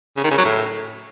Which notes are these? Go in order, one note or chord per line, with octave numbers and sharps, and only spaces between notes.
C#3
D#3
C#3
F#3
A2